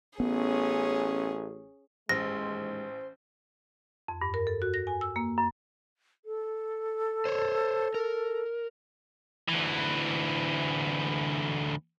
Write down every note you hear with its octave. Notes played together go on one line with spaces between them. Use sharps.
A1 B3 C#4 G#4
A1 D#2 G#2 G#3 C5 A#6
F2
G2
A#4
A4
F#4
A#6
G#5
E6
A#3
F#2
A4
C5 C#5
A#4
D2 E3